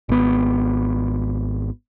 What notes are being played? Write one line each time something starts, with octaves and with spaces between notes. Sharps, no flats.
G#1 B3